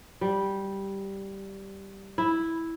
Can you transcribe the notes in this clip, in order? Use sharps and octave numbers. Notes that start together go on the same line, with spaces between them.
G3
E4